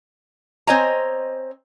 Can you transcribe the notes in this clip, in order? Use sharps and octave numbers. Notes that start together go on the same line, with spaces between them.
C4 C5 C#5 D#5 G#5 A#5